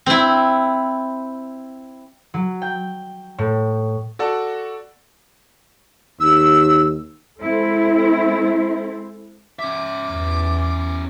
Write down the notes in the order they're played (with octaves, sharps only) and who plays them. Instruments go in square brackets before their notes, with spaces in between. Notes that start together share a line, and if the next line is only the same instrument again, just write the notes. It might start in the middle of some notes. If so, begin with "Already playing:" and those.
[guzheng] C4 E4
[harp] F#3
G5
A2
[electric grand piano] F#4 A4 D5 F#5 A5
[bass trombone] D#2 [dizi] E6
[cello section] G#3 C4 E4 A4
[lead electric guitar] C#4 E5 [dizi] D6
[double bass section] E2